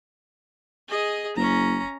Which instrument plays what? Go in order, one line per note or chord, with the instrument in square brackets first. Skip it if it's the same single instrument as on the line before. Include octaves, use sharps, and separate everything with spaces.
[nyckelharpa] G#4 D#5
[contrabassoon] F#1 [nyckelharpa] C#4 A#5